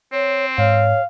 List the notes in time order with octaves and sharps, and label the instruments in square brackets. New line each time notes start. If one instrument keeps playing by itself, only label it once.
[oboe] C4 [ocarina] C#5
[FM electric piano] G#2 [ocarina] C#5 [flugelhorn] F5